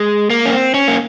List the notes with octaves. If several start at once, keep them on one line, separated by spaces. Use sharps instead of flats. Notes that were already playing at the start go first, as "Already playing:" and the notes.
Already playing: G#3
A#3
C#4
C4
C#4
A#3